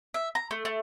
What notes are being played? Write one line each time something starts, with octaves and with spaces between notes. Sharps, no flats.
E5
A#5
A3
A3